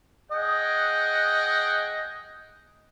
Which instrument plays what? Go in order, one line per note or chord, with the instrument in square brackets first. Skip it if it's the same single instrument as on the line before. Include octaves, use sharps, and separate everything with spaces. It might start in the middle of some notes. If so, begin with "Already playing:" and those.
[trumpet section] G#4 F#5 G5 [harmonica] D#5